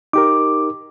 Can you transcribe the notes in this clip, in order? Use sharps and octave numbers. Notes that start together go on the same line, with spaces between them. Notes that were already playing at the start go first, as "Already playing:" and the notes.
D#4 G4 A#4 D6